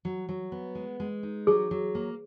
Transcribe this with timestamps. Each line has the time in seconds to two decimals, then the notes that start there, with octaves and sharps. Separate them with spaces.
0.05 F#3
0.29 F#3
0.52 B3
0.75 G#3
1.00 G#3
1.23 D#4
1.47 F#3 G#4
1.71 F#3
1.95 A#3